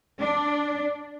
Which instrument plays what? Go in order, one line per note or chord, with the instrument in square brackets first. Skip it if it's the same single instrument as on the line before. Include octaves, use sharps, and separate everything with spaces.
[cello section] D4